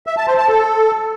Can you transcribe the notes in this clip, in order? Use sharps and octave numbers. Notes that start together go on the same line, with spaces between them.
E5
A5
C5
A5
A4